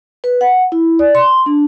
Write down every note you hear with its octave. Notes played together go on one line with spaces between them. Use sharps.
B4
F#5
E4
D5
C6
D4